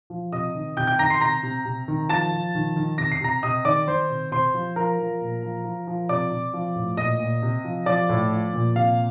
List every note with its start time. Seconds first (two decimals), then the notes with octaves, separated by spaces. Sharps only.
0.10 F3
0.32 C3 D#5 D#6
0.55 D#3
0.77 C3 G5 G6
0.87 G5 G6
0.99 D#3 A#5 A#6
1.10 C6 C7
1.21 C3 A#5 A#6
1.43 C3
1.65 C3
1.88 D#3
2.09 F3 A5 A6
2.32 F3
2.55 D#3
2.76 D#3
2.98 C3 A#6
3.12 C7
3.20 C3 A#5 A#6
3.43 C3 D#5 D#6
3.65 D#3 D5 D6
3.87 D#3 C5 C6
4.10 C3
4.32 C3 C5 C6
4.54 F3
4.76 F3 A#4 A#5
4.99 F3
5.21 A#2
5.43 F3
5.64 F3
5.87 F3
6.09 C3 D5 D6
6.31 C3
6.54 F3
6.75 A2
6.97 A#2 D#5 D#6
7.20 A#2
7.42 C3
7.65 F3
7.86 F3 D5 D6
8.09 A2
8.31 F3
8.54 A#2
8.76 C3 F5